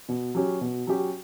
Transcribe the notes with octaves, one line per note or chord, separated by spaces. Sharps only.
B2
F#3 C#4 G4
B2
F#3 C#4 G4